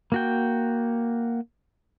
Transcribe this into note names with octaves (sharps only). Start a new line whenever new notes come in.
A#3 F#4 G5